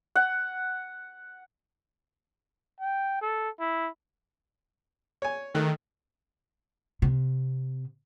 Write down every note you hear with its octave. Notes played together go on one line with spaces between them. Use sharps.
F#5
G5
A4
E4
C#5 G#5
D#3 A3 F#6
C3